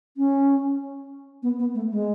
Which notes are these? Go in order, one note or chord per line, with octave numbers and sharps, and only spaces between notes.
C#4
B3
B3
A3
G#3